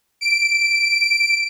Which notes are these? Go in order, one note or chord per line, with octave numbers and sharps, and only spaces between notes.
D7